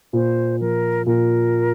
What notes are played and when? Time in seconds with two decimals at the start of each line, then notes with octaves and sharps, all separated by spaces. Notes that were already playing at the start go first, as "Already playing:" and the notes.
0.13 A#2 C5
0.60 F3 A#4
1.06 A#2 A#4